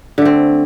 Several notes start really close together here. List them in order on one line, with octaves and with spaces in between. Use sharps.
D3 A3 C4